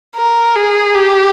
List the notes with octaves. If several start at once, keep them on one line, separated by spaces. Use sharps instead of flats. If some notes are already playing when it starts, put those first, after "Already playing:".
A#4
G#4
G4